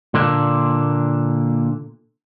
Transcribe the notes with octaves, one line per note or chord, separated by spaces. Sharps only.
A#2 D3 A#3 D4